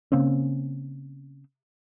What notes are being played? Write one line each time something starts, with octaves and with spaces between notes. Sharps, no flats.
C#3 A#3 C4 C#4